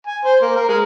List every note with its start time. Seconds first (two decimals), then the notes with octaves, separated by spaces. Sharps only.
0.07 G#5
0.25 C5
0.42 A#3
0.56 A#4
0.69 G#3